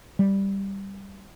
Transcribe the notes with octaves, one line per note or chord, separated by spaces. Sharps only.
G3